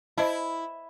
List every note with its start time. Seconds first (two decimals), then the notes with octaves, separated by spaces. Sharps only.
0.18 E4 C5 D#5 A5